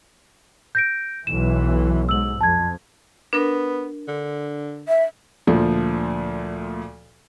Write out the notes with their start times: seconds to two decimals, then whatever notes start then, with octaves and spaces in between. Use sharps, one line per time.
0.75 G6 A#6 D7
1.27 B1 E3 E7
2.09 G#2 E6 F#7
2.41 F2 A5 G#6
3.33 B3 D4 A#4
4.08 D3
4.88 E5
5.47 D2 A#2 F3